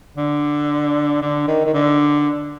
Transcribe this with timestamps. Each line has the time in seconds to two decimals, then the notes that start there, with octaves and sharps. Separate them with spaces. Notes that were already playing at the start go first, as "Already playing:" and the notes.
0.18 D3
1.22 D3
1.48 D#3
1.66 D#3
1.74 D3